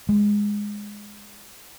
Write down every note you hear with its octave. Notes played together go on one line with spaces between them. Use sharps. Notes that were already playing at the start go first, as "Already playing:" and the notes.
G#3